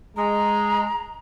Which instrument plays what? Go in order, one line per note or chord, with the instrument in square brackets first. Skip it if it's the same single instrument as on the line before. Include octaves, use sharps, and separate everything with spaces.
[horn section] G#3 [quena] A#5